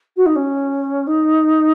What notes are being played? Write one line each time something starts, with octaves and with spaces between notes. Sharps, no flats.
F#4
D#4
C#4
D#4